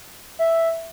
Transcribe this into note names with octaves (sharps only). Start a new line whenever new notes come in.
E5